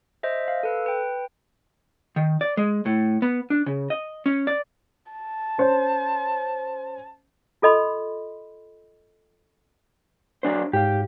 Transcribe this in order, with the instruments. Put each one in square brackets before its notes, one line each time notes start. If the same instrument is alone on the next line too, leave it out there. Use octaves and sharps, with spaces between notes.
[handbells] C5 D#5 E5
F5
A4 B4
B4 G5
[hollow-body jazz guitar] D#3
D5
G#3
A2
B3
D4
C#3
D#5
C#4
D5
[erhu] A5
[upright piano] C#4 C5
[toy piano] F4 A4 D#5 B5 C6
[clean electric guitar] F#3 D4 C5
[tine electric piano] G#2 C#5 F5 [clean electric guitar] G4